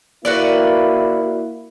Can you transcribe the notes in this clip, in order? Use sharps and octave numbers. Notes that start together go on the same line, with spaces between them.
A#3 E4 F#4 B4 D5